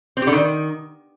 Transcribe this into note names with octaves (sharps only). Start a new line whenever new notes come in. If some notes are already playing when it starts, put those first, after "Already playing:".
C4
G4
D3
D#3